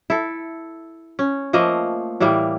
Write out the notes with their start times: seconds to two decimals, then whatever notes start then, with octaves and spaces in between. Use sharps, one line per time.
0.10 E4 A4
1.19 C#4
1.53 F3 A3 A#3 D#5
2.20 A2 E3 G3 A#3